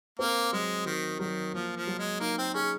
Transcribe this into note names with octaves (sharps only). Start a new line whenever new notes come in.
A#3 C4
F#3 G#3
D#3 F#4
D#3 F#3
F3 A#3
F3
F#3
G#3
A#3 D#4
C4
C#4 G#4